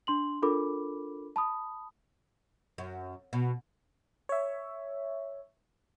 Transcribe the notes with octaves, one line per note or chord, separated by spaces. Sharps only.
D4 C6 F#7
D4 F4 A4 A#4 B5 D6
A5 B5 D#6
F#2
B2
C#5 E5